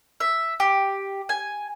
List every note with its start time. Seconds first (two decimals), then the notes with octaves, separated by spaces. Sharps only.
0.20 E5
0.60 G4
1.29 G#5